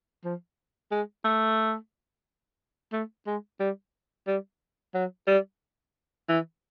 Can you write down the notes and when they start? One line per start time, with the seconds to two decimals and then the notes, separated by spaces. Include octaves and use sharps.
0.24 F3
0.92 G#3
1.25 A3
2.93 A3
3.27 G#3
3.60 G3
4.27 G3
4.95 F#3
5.28 G3
6.29 E3